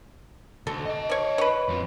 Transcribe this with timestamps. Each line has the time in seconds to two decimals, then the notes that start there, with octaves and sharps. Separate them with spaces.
0.67 D2 A4
0.85 D#5 A5
1.10 C#5 D5
1.38 B4 C#5
1.68 F2 F3